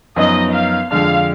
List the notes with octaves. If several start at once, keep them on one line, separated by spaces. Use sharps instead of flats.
F#2 F3 B3 D#4 D#5
F5
F2 D3 G#3 D4 F5